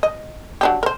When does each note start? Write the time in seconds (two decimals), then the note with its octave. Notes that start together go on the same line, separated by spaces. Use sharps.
0.03 D#5
0.61 F#3 D4 G4
0.83 A#4 C5